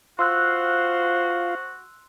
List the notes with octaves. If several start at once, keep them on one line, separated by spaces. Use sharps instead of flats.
F4 F#4 C5 F5 C6 E6 F#6